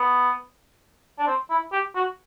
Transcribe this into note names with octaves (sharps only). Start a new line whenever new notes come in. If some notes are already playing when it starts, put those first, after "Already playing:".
Already playing: B3
D4
C4
E4
G4
F#4